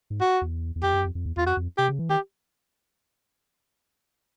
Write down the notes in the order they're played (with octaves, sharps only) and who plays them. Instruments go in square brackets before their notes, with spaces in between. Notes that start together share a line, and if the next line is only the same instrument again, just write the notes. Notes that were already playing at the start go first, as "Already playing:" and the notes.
[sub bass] G#2
[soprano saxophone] F#4
[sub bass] E2
E2
[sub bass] F2 [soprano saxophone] G4
[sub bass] F#2
F2
F2
E2
[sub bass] E2 [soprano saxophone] F4
[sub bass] F2 [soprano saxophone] F#4
[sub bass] F2
[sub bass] C3 [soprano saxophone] G4
[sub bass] C#3
E3
[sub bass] D#3 [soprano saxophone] G4